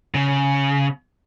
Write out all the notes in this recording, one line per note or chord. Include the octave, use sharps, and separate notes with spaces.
C#3